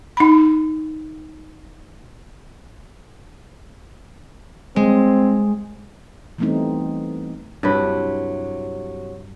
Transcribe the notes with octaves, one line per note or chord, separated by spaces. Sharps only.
D#4 B5
G#3 C4
E3 G3 A3 B3 C4 D#4
G2 C3 F#3 E4 B4